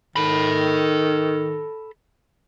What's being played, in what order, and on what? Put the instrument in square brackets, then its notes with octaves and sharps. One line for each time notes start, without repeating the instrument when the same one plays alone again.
[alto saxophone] D#3 [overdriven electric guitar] A4 B5